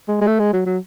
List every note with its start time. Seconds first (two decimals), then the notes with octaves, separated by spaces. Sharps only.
0.08 G#3
0.21 G#3
0.27 A3
0.39 G#3
0.53 F#3
0.66 F#3